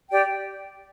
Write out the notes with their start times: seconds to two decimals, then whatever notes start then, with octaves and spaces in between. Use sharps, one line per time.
0.08 G4 D5 G5